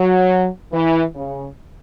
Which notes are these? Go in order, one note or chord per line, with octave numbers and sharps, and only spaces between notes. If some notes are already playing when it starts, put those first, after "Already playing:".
Already playing: F#3
E3
C#3